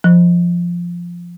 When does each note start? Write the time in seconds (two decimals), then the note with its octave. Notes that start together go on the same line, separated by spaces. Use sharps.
0.04 F3